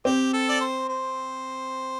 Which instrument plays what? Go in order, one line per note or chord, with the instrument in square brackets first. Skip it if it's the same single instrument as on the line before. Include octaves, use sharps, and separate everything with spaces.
[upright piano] C4 [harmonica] G4
[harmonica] A4
D5
C5
C5